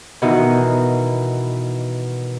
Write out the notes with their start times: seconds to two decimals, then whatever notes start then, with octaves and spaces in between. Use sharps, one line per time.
0.22 B2 D#3 E3 D#4 F#4